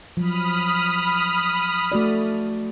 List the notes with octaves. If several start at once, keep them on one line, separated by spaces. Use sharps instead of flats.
F3 F#3 B5 D#6 F6
A3 F#4 D5